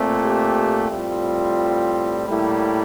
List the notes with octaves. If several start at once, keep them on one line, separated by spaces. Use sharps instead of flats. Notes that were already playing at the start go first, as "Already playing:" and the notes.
Already playing: A#2 A3 C4
G4
A2 G3 C4 F4
A2 G3 A#3 E4